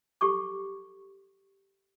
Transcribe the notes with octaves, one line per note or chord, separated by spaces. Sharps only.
G4 A4 C#6 D6